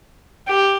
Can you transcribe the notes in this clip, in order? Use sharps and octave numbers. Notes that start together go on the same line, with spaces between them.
G4